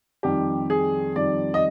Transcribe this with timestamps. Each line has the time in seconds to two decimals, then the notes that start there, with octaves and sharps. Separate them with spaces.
0.23 F2 D#3 G3 G4
0.70 G#4
1.16 F2 D#3 G3 D5
1.54 D#5